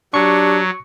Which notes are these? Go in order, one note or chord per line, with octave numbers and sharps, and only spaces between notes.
F#3 D4 G4 C#6 C#7